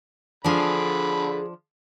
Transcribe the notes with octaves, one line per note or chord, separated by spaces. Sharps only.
D3 F3 D4 G#4 A4 F5 B5